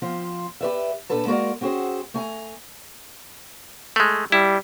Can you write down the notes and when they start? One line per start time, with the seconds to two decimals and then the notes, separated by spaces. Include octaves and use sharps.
0.02 F3 C4 F4
0.61 G4 B4 D5 E5
1.10 A#2 D4 A4 B4 A5
1.26 G#3 A#3 F#4 A#4 D5
1.61 C4 C#4 F#4 G#4 C5
2.14 A3 G#5 A#5
3.96 G#3 A3
4.32 G3 E4